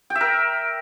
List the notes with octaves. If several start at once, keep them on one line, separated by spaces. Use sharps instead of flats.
G5
E5
A#4